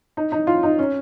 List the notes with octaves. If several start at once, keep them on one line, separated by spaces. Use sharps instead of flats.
D#4
D#4
F4
D#4
C#4